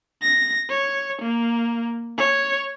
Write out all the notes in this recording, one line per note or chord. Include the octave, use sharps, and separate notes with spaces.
A#6
C#5
A#3
C#5